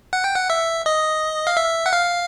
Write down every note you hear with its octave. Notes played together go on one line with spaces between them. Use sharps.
F#5
G5
F#5
E5
D#5
F5
E5
F#5
F5